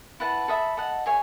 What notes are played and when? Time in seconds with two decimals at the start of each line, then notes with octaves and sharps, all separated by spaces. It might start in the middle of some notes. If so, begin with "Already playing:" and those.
0.20 E4 B4 F#5 A5
0.48 A4 E5 B5 D#6
0.77 A4 D#5 F#5
1.06 G#4 C#5 E5 G#5